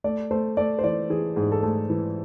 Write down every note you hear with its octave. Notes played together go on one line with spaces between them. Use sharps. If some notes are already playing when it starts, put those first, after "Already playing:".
A3 D5
A3 C5
A3 D5
C5
E3 D5
E3 G#4
G#2 G#4
A4
A3 G#4
E3